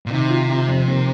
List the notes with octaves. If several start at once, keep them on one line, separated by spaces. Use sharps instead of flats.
A#2
C3 D#3
F4
F4
F2
A#3